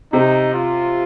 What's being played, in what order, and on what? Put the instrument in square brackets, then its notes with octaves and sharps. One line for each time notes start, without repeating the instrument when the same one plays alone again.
[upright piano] C3 [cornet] D#4
[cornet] F4